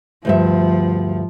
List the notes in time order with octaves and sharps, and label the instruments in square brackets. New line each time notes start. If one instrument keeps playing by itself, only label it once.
[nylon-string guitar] D2 G2 E5 [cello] F3